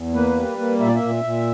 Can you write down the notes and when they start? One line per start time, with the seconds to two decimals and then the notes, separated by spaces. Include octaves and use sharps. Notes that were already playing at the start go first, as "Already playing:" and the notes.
Already playing: E2
0.14 A#3 B4
0.37 G3
0.58 A#3
0.80 A#2 E5
0.88 D5
0.95 E5
1.02 A#2
1.24 A#2